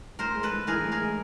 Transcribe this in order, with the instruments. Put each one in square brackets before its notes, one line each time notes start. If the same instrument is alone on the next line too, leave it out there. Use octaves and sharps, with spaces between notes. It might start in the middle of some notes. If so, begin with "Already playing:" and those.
[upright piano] A2 [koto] A#4 C5
[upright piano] G#3
[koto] A4 B4
[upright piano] A2
[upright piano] E3 [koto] G#4 A#4
[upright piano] A2
[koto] G#4 A#4
[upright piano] G#3